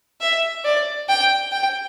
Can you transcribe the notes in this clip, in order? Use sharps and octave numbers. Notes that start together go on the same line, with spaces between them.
E5
D5
G5
G5